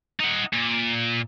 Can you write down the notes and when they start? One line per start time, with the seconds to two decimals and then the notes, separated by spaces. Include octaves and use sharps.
0.20 D#4 F#5
0.53 A#2